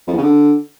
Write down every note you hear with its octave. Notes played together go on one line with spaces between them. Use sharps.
F2
E2
C#3
D3